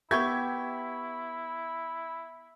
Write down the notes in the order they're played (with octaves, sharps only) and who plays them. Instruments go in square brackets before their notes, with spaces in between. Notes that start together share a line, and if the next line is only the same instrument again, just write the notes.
[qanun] B3 G4 G5 [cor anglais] E4 [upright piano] E5 C#6 G#6